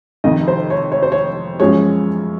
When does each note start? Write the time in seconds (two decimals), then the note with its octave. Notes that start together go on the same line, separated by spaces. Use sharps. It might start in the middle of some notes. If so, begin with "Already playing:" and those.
0.24 F1 F2 D#3 D#5
0.48 C5
0.70 C#5
0.92 C#5
1.03 C5
1.12 C#5
1.60 F#2 F3 G#3 C#5